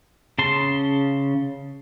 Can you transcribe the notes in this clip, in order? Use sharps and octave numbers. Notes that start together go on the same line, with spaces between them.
C#3 A5 C6